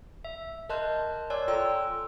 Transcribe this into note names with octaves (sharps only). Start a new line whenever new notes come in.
E5
A#4 D#5 A5 C6 F#6 G6
C#5 D5 G#5 C6 E6 F#6
F4 A4 G5 A#5 C6 E6